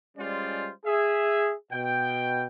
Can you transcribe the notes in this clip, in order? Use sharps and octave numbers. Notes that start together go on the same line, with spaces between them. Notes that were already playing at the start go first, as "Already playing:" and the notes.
G3 G#3 C#4 F4 C5 D5
G#4 E5
B2 G5